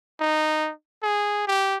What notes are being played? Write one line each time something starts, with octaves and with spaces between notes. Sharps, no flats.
D#4
G#4
G4